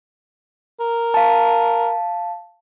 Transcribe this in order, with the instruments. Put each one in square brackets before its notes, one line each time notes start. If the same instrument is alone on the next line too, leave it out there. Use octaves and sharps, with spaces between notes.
[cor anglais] A#4
[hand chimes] F5 A5